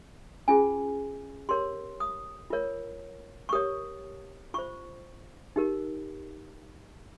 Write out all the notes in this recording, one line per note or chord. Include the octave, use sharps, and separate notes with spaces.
C#4 F4 G#4 G#5
G4 A#4 C#5 C6
D#6
F4 A#4 C#5
C#6
G4 A#4 C#5 D#6
F4 C5 C#6
D#4 G4 A#4